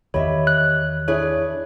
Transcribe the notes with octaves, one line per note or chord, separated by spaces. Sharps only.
E2 D#3 G4 C#5 D#5 E5 B5
F#6
D4 E4 G#4 C#5